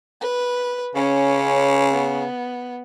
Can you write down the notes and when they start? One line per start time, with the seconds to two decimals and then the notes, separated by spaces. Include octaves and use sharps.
0.21 B4
0.95 C#3 C#4
1.93 B3